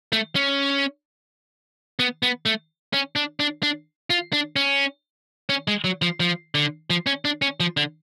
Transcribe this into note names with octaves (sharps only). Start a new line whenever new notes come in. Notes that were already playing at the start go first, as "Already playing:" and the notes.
A3
C#4
B3
B3
A3
C#4
D4
D4
D4
F4
D4
C#4
C#4
G#3
F#3
F3
F3
D3
F3
C#4
D4
C#4
F3
D3